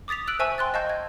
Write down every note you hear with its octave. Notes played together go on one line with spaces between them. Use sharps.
D6 D#6 A6 B6 F7
E6 F#6 D7 F#7
C5 E5 G#5 A5 C#6 E6
G5 C6 F#6 A6
D#5 F5 A5 C#6 G6
G#6